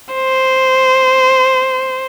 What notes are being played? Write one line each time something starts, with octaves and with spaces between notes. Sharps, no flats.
C5